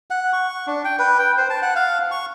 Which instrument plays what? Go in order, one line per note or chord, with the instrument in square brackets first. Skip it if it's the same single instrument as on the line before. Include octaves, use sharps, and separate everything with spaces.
[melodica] F#5
C#6
D4
G5
B4
G5
C5
A5
F#5
F5
C#6